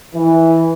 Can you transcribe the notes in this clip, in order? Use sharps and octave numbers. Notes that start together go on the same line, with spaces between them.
E3